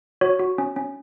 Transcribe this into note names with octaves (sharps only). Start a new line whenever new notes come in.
F#4 C#5
F#4
C#4
C#4